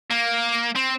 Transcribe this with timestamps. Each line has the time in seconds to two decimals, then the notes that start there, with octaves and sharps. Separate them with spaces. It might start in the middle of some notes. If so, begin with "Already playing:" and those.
0.11 A#3
0.75 C4